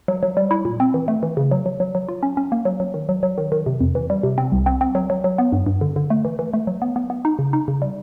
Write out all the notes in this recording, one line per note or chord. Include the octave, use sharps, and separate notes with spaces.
F#3
F#3
G3
E4
A#2
C4
E3
A3
E3
C#3
F#3
F#3
F#3
F#3
F4
C#4
C#4
A#3
F#3
F#3
D#3
F#3
F#3
D#3
D#3
C3
F2
E3
G3
C3
C4
C2
C4
C4
F#3
F#3
F#3
B3
G2
G2
D3
D3
A3
E3
E3
A3
F#3
B3
B3
B3
D#4
C#3
D#4
C#3
G3